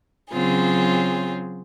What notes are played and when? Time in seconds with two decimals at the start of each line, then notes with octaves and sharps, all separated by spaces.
0.31 C#3 F#3 C4 F4 G#4